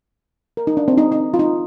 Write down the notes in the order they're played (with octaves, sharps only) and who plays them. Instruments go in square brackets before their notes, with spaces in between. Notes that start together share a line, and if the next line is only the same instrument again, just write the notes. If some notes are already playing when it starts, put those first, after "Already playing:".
[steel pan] A#4
D#4
D4
C4
D#4
D#4
F4
D#4